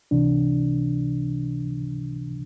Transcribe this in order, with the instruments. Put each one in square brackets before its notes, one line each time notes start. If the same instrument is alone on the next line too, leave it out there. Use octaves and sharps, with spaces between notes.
[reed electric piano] C#2 C3 E3 D4